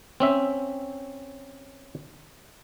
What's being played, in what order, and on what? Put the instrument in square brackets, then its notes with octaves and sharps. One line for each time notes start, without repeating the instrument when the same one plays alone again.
[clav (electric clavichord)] C4 C#4 E5